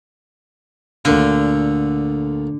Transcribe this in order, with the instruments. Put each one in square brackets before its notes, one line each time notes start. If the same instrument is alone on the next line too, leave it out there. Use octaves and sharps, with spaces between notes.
[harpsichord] D2 A#2 F4 [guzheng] D3